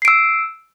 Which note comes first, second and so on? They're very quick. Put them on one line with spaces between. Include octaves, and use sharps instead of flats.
C7 D7 E6